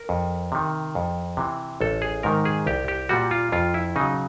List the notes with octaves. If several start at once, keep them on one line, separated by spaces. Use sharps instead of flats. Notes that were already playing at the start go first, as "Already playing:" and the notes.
Already playing: A#4
F2
C3 D#3
F2
C3 E3
A1 A4
G#4
G#2 D#3 A#4
G#4
C2 G4
G4
A#2 G3 F#4
F4
F2 F4
E4
C#3 F#3 D#4